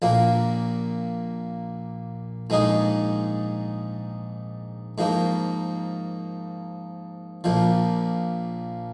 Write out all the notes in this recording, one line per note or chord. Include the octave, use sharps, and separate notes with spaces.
A#1 A#2 A#3
A#1 G#2 G#3 D#4 G#4
G#2 F3 A#3
A#1 A#2 F3